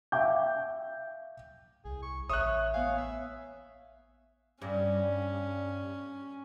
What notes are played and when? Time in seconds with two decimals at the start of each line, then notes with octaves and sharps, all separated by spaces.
0.12 E5 F5 G5 D6 G6
1.85 C2 G#4
2.03 C#6
2.30 A1 C#5 E5 D#6 F#6
2.74 B3 C#5 F5 G#5
2.98 E5
4.62 G2 C#4